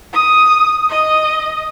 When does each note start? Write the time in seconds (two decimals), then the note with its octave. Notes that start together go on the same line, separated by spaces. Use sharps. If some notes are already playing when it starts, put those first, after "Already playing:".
0.13 D#6
0.90 D#5